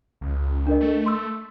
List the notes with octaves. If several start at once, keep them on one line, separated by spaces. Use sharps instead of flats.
C#2
D4 A#4 D#5
A3
C6 E6